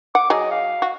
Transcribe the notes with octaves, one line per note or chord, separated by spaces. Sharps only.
F#5 D6
F#3 G#4 D#5
F5
F#4